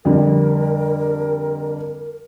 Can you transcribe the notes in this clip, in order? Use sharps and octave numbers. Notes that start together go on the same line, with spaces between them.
F2 D3 G3 A#4